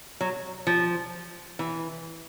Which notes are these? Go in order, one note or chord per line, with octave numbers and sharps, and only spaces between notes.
F#3
F3
E3